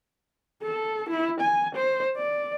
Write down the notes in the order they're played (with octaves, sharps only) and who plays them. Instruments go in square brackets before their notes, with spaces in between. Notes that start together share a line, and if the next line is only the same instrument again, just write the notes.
[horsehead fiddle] A4
E4
G#5
C5
D5